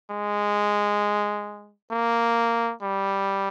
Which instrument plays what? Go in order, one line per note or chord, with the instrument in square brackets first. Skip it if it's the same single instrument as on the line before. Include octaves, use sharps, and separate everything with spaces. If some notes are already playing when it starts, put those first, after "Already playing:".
[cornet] G#3
A#3
G3